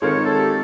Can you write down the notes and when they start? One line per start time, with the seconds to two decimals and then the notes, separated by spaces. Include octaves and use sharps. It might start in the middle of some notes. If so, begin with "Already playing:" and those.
0.02 D#3 G#3 C4 F4 A#4 C#5
0.25 A4
0.37 G4